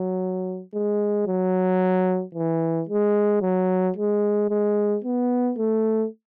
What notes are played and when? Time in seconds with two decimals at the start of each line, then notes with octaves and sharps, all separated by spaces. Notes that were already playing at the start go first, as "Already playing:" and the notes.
Already playing: F#3
0.73 G#3
1.27 F#3
2.35 E3
2.89 G#3
3.42 F#3
3.97 G#3
4.50 G#3
5.04 B3
5.58 A3